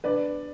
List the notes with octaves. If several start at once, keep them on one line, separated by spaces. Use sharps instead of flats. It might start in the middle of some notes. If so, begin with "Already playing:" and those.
D4 B4 D5